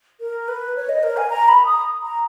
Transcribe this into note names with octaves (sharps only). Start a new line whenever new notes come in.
A#4
B4
C#5
D#5
A#4
G#5
A#5
B5
D#6
A#5